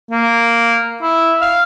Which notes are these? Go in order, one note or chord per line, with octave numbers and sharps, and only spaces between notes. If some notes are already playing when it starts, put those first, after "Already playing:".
A#3
E4
F5